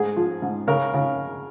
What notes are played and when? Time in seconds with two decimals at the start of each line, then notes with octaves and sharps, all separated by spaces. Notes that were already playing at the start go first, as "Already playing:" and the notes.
Already playing: G#2 G#4
0.16 F3
0.42 G#2
0.67 C#3 A#4
0.94 C#3